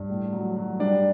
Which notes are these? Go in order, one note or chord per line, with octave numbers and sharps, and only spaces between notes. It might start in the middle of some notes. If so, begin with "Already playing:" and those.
Already playing: G2
A2
F#3
F#3
G3 D4 D5